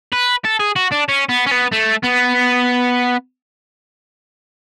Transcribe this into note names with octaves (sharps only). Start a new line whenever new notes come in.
B4
A4
G#4
F#4
D4
C#4
B3
C#4
B3
A3
B3